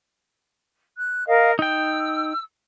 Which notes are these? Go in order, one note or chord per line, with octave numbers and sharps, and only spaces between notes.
F#6
A#4 D#5 F5
D#4 G5 E6